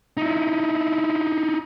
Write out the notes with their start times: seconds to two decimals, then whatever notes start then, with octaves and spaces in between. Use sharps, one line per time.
0.17 D#4 E4